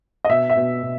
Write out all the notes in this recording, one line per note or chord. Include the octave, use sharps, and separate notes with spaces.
D#5
B2 E5
E5
B2
B2